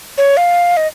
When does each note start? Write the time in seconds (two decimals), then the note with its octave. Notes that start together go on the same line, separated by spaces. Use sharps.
0.18 C#5
0.37 F5
0.77 D#5